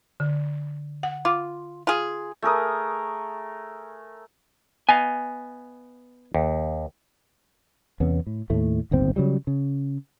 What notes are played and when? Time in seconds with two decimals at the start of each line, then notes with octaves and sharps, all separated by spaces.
0.20 D3
1.03 F#5
1.25 F4 D6
1.87 F4 G#4
2.42 A3 G#4 A#4 D#6
4.89 B3 D#5 F5 G#5
6.35 D#2
8.00 E2 C3 B3 C#4
8.27 A2
8.50 D#2 A2 A3
8.91 D1 G1 D#2 C4
9.16 C#3 F#3 G3
9.47 C#3